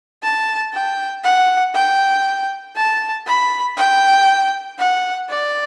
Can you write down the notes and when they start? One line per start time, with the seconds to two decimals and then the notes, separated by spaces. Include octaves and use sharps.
0.23 A5
0.73 G5
1.24 F#5
1.74 G5
2.76 A5
3.26 B5
3.77 G5
4.78 F#5
5.29 D5